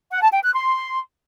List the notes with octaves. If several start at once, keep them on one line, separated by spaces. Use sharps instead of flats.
F#5
A5
G5
F#6
C6